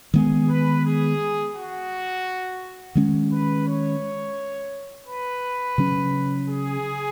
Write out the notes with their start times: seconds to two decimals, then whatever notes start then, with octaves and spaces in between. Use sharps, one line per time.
0.13 D#3 G#3 B3 G#4
0.49 B4
0.84 G#4
1.56 F#4
2.95 D#3 G#3 C#4
3.31 B4
3.66 C#5
5.07 B4
5.78 C#3 F#3 C#4
6.48 G#4